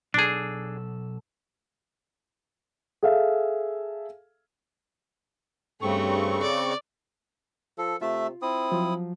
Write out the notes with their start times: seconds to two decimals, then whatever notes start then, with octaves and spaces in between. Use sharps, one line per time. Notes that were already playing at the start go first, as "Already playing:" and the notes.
0.14 B1 D4 G#4 A4
3.03 G#4 A4 E5 F5
5.82 G2 C#3 A3 C4 C#6
6.42 D5
7.78 F3 A4
8.01 C3 A3 F4 E5
8.42 C4 E4 D#6
8.72 F3 F#3